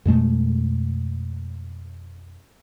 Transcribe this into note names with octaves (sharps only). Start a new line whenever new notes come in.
F2 B2 G#3 A3